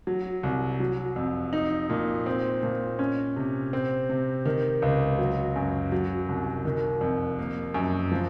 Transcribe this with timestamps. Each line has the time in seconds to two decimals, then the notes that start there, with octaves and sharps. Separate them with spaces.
0.07 F#3
0.43 C2
0.80 F#3
1.16 F2
1.53 D#4
1.90 A#2
2.26 C4
2.63 A#2
2.99 C#4
3.36 C3
3.73 C4
4.09 C3
4.45 D#3
4.82 C#2
5.19 F#3
5.56 F#2
5.92 F#3
6.29 C2
6.65 D#3
7.01 F2
7.39 A#3
7.74 F#2
8.12 F3